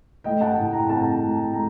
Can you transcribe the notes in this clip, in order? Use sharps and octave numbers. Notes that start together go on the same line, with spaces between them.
A3 D#5 G5
F#5 A5
A2
G5 A#5
C4 F#5 A5
A3
A3 G5 A#5